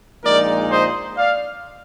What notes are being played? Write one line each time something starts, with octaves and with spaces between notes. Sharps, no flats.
A#1 A#2 G#3 D#4 A#4 D5
C5 D#5
D5 F5